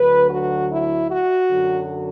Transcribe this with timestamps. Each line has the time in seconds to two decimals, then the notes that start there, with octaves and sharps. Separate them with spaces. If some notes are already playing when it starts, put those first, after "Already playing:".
Already playing: D2 D3 F#3 B4
0.30 F#4
0.71 E4
1.10 F#4
1.51 F#2 D3 F#3